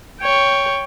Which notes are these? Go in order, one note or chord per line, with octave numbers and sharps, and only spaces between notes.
C#5 G5